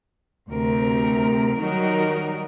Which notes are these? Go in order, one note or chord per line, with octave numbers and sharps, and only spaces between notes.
D2 C3 A#4
D#3 F#3 G3 D#4 F#4 A#4